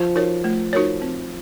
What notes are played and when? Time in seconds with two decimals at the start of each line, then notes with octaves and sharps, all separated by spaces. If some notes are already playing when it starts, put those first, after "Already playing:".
Already playing: F3
0.15 D#4 F#4 A#4 C#5
0.44 A3
0.73 D#4 F#4 A#4 C#5
1.02 C4